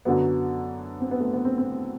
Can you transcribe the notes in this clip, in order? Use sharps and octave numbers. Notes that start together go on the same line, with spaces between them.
F#2 D3 F#3 B3
C4
B3
A3
B3
C4
C4